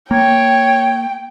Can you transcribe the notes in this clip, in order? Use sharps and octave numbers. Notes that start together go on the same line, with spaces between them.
A#3 C#5 G5